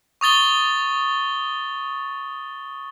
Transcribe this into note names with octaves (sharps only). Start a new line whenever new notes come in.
C#6 D#6 A6 G7